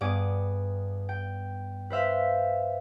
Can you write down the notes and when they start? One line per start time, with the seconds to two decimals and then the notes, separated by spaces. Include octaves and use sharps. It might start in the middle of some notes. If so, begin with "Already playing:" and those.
0.01 G2 B3 G#4 D6
1.09 G5
1.90 B4 C5 E5 F5